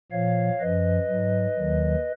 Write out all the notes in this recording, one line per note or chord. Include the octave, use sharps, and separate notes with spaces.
A#2 F3 C#5 F5
F#2 F3 B4 D#5
G#2 F#3
D#2 D#3 F#3